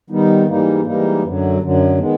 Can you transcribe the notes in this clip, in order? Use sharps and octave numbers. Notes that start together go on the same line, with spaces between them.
D#3 G3 B3 D#4
G#2 E3 G3 A#3 D#4
G#2 E3 G3 A#3 D#4
F#2 D3 F#3
F#2 D3 F#3
D#3 G#3 B3